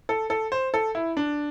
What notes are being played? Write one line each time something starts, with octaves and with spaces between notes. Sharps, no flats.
A4
A4
C5
A4
E4
D4